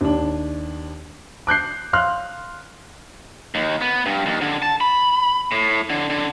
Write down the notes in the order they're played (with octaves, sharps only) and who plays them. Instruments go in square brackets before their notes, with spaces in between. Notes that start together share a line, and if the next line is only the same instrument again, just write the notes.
[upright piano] D#2 D4
D6 F#6 G6 C7
F5 C6 F6 F#6
[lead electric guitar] D#2
B3
G2
D#2
D3
A5
B5
A2
D3
D3